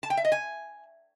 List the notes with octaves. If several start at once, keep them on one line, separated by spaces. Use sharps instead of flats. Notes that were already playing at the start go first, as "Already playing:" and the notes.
A5
G5
E5
D#5
G#5